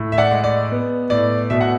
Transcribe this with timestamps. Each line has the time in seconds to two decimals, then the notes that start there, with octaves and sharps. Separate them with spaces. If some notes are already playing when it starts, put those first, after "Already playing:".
Already playing: A2
0.12 E5
0.18 D5 F#5
0.31 G#3
0.44 D5
0.71 B3
1.10 A2 D5
1.50 B2 E5
1.61 F#5